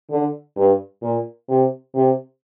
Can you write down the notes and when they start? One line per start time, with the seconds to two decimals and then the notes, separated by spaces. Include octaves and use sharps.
0.10 D3
0.56 G2
1.02 A#2
1.49 C3
1.95 C3